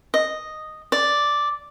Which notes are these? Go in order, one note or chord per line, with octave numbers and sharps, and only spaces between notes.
D#5
D5